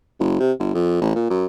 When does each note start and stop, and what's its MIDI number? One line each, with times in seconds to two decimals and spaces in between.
0.19 0.38 30
0.40 0.52 48
0.59 0.70 31
0.74 0.99 41
1.01 1.13 33
1.15 1.26 46
1.30 1.46 42